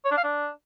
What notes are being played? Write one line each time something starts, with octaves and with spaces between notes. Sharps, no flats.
C#5
D4
F5
D4